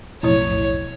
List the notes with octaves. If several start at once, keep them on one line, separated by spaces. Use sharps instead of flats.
B1 F2 A2 E4 C#5 D#5 D#6